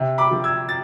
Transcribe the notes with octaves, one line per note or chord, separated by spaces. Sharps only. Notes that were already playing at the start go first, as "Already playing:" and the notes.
Already playing: C3
B5 D6
F3
E6 G#6
A6